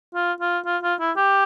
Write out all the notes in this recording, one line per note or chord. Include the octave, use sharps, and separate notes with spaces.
F4
F4
F4
F4
E4
G4